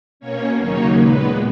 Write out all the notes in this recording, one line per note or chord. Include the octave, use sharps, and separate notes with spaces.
B2 A#3 C#4 C#5
D#2 C#3 F#3 A#3 D#4 C#5
A#2 G#3 B3 B4